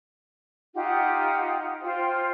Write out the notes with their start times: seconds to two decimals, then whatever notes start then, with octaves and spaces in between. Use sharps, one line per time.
0.74 D#4 F4 G4 F#5
1.82 F4 C5 G5